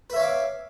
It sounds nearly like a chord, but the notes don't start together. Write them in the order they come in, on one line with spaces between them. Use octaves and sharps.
B4 E5 C#5 F5 D6